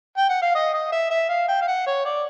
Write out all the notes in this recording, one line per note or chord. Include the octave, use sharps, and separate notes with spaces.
G5
F#5
F5
D#5
D#5
E5
E5
F5
G5
F5
F#5
C#5
D5